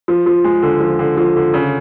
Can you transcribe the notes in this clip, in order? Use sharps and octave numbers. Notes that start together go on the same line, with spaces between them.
F3
F3
G#3
D3
F3
D3
F3
D3
C#3